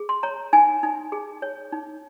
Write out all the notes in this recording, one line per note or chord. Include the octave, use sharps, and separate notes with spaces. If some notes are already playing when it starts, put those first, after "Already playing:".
Already playing: G#4
C6
C#5 A#5
D#4 G#5
D#4
G#4
C#5
D#4